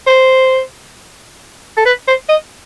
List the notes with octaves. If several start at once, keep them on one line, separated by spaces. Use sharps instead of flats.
C5
A4
B4
C5
D#5